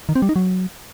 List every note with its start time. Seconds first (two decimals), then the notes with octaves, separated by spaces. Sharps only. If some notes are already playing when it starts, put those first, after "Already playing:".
0.09 D#3
0.16 C4
0.22 G3
0.29 D#4
0.36 F#3